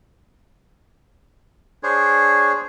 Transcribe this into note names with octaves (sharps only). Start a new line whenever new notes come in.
D4 G#4 C5 C#5